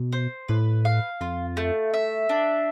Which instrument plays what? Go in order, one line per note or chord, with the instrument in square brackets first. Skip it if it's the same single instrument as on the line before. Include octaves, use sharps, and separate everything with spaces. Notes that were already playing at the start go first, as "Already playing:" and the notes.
Already playing: [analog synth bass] B2
[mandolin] C5
[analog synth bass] A2 [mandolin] B4
[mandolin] F5
[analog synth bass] F2 [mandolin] F4
[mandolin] A3
E5
D4